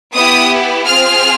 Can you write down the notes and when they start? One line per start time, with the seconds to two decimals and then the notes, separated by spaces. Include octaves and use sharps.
0.14 B3 E4 G4 D#6
0.86 C4 F4 G#4 F6